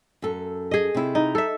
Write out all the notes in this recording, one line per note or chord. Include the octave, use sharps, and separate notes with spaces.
F#2 A4
G#4 D#5
C3 E4
D#4
A4 E5